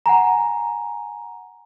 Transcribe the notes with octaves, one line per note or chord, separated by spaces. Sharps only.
F#5 G#5 A#5